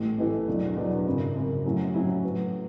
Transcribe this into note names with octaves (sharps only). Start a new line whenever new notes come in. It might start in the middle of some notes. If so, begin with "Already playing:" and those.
Already playing: A1 A2 E3 A3
A1 A2 E3 A3
E2 B2 F#3 B3 D4
E2 B2 F#3 B3 D4
G#1 F#2 C#3
G#1 F#2 C#3
A2 F#3 C#4 E4
A2 F#3 C#4 E4
A2 F#3 B3